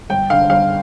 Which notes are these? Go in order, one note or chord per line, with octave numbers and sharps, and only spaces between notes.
G1 G5
D3 F5
G1 F5